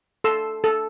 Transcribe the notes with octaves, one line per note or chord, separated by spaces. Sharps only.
A4 C6 E6
A4